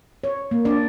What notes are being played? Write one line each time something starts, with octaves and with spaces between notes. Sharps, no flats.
C#5
A#3
D4 D5